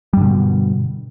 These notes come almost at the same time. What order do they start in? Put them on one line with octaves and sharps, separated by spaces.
G3 G2 D3 B2